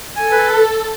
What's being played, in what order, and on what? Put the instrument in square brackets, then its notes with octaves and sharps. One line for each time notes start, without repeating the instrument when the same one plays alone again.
[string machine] A4 [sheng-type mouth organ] G#5
[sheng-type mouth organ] B4